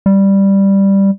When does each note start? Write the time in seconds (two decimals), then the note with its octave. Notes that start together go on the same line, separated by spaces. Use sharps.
0.06 G3